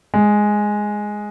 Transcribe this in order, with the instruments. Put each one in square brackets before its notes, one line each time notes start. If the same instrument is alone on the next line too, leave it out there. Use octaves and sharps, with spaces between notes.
[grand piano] G#3